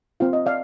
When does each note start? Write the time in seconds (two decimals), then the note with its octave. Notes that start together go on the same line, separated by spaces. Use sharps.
0.20 C4 F4 F5
0.33 D#5
0.46 D5 F5